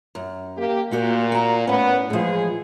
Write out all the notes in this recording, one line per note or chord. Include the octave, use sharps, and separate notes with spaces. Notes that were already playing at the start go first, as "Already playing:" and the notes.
F#2
A#3 G4
A#2 A#3 F#4 G4
F#4 A#5
A2 B3 C#4
A2 E3 F3 G#3 G#4